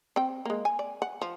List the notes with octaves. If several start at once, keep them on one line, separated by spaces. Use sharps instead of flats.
C4 G5
G#3 A#3
G#5
D5
F#5
F3